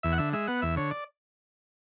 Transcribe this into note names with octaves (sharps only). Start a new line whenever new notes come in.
E2 E5
F#5
D3 E5
G#3 E5
B3 F#5
E2 E5
D3 C#5
D5